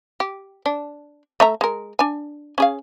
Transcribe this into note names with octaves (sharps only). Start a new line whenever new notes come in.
G4
D4
A3 E5 A#5
G#3 A#4
D4 G#5
C#4 G#4 F5